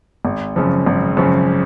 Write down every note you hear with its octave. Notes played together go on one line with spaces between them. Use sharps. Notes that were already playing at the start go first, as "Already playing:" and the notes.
G#1
F#2 C#3 F3
G#1
F#2 C#3 F3